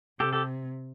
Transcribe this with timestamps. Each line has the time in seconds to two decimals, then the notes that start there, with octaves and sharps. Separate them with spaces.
0.20 C3 G4 A4
0.33 G4 A4